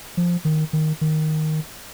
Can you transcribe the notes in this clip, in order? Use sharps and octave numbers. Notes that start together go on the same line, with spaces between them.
F3
D#3
D#3
D#3